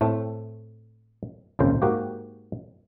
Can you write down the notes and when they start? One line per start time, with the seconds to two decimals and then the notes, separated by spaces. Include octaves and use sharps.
0.01 A2 A3 C4
1.59 G#1 C#2 A#2 C#3 C5
1.82 G#2 A#3 F#4 G4